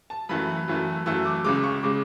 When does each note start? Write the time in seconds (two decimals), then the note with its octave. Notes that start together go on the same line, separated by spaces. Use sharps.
0.10 A5
0.29 F#2 E3 A3 B5
0.68 F#2 E3 A3
1.06 F#2 E3 A3 E6
1.25 D6
1.44 C#2 C#3 G#3 D6
1.63 C#6
1.83 C#3 G#3 D6